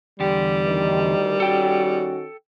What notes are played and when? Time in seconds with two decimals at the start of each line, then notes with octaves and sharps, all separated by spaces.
0.20 E2 D3 G3 G4
0.67 D2 D#3
1.40 D#3 C#4 F#4 A4 G5